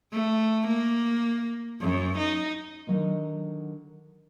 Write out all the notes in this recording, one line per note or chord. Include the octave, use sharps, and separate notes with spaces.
A3
A#3
F#2
D#4
D3 D#3 F3 F#3 A#3 D#4